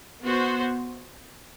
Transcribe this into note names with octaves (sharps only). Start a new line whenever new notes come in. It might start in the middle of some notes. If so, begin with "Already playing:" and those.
B3 F#4 C5